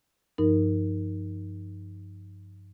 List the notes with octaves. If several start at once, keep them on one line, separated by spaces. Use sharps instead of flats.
G2 F3 D#4 A#4